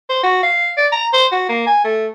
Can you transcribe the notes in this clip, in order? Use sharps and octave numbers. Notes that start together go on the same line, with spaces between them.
C5
F#4
F5
D5
A#5
C5
F#4
A#3
G#5
A3